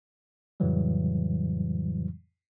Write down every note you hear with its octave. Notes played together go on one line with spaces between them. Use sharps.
F2 A2 C#3 E3 F#3 G3